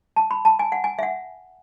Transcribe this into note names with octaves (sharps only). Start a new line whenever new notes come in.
A5
B5
A5
G#5
F#5
G#5
E5
F#5